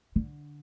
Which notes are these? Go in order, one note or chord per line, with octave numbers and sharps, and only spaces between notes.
D3